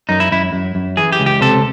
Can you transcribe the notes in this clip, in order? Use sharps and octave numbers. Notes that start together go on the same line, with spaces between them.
F#2 D#4
E4
F#2 E4
F#2
F#2
E3 G#4
G4
C#2
G4
C3 A4